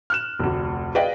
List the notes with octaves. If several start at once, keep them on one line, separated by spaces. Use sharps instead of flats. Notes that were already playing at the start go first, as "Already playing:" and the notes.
F6 F#6 E7
F1 D2
G#4 B4 D5 D#5 F5 G5